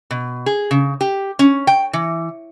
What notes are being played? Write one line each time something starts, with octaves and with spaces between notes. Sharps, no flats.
B2
G#4
C#3
G4
C#4
G5
E3